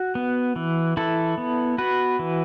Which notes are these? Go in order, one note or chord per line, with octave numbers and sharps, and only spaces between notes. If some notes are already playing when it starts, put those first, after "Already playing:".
Already playing: F#4
B3
E3
E3 E4 A4
B3
B3 F#4 B4
E3